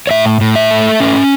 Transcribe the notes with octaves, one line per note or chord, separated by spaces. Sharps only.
C#5
A2 E5
A2
E5
A3
C#4